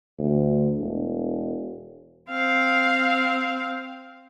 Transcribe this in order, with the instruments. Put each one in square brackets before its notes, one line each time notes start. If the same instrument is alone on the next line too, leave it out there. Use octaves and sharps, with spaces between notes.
[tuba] D2
E1
[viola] C4 F5